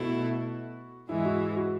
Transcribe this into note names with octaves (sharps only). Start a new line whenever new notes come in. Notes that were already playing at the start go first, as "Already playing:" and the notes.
Already playing: B2 A3 E4 F#4
G#2 E3 G#3 E4
F#4
F#4